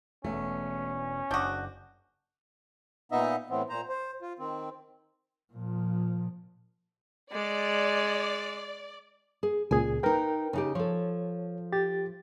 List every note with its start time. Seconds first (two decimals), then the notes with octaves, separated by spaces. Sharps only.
0.24 E1 E2 A3 C#4
1.31 F#1 D4 F#4 D6 D#6 G6
3.12 A#2 B3 D#4 D#5 E5
3.50 A2 E3 B3 C4
3.69 A#2 C5 A#5
3.89 C5
4.22 F4
4.39 D#3 C4
5.53 A#2 F3
7.32 G#3 D5
9.43 G#4
9.71 C#2 A#2 G#4 G#5
10.03 D#4 A#4 B4 G5
10.53 C#3 D#4 G4
10.75 F3 A4 C#5
11.72 G4 A6